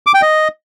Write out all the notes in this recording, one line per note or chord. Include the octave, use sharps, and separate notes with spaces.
D6
G5
D#5